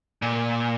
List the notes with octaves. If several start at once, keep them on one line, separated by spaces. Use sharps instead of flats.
A#2